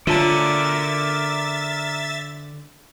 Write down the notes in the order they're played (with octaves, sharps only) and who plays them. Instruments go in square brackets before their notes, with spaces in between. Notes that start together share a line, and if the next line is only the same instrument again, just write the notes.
[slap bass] D3 [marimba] F4 C#5 A5 [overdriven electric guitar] A#4 D5 [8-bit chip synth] E5 A6